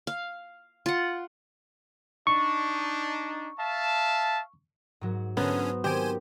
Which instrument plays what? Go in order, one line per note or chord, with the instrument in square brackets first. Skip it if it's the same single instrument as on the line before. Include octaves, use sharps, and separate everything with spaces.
[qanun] F5
F4 F#5
[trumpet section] D4 D#4 [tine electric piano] C#6
[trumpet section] E5 F5 A5
[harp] G#2 F#3 F#4
[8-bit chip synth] D3 C#4 [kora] B3 [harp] C5 A#5
[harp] D#3 C4 D7 [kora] G4 [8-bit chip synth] C5 G#5